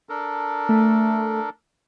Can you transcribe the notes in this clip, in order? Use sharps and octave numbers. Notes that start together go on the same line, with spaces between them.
D4 A4 A#4
A3